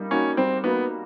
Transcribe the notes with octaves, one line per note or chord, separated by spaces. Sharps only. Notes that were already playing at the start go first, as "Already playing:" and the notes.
Already playing: G3 A#3 D#4
A#3 C#4 D#4 F#4
G3 C4
A#3 B3 D#4 F#4